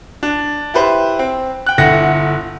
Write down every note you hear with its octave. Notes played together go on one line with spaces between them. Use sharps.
D4
E4 G4 B4 C5
C4
G5 F#6
G1 D3 E4 F#5 A#6